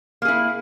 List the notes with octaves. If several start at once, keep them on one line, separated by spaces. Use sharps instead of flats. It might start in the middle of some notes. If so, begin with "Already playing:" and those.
A#3 E4 G#4